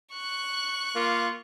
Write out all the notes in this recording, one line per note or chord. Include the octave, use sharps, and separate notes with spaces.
C#6 F#6
A#3 F4